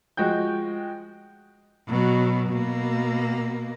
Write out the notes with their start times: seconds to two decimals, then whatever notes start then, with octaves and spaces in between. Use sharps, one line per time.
0.17 F3 G#3 F#4 G5 G6
1.88 B2 F#3
2.49 B2 A#3